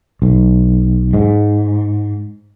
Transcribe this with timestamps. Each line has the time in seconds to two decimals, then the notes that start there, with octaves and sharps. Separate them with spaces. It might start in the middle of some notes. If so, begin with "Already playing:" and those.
0.22 B1
1.14 G#2